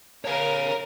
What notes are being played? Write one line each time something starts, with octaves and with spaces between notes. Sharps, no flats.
A#4 C#5 F5